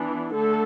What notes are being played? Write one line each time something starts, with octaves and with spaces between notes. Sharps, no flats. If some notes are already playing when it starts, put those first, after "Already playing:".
Already playing: E3 B3 D4
D3 A3 A4